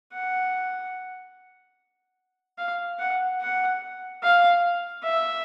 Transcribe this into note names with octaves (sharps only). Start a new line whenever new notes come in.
F#5
F5
F#5
F#5
F5
E5